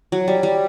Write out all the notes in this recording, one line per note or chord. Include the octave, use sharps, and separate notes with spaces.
F#3
G3
G3